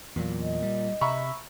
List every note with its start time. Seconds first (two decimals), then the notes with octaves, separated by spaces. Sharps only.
0.16 E2 A#2 F#3
0.41 D#5
0.62 G3
1.01 C3 E5 A#5 B5 C#6